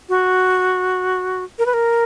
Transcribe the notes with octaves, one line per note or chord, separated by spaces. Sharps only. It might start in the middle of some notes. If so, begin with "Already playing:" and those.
F#4
A#4
B4
A#4